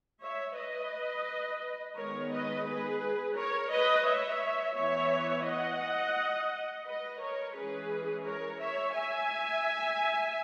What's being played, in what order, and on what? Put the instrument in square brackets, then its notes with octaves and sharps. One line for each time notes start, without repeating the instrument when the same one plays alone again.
[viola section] C#5 E5
B4 D#5
D#3 G#3 B3 A#4 C#5
B4 D#5
G#4 B4
A#4 C#5
B4 D#5
C#5 E5
E3 B3 C#5 E5
D#5 F#5
B4 D#5
A#4 C#5
E3 G#3 C#4 G#4 B4
A#4 C#5
C#5 E5
E5 G#5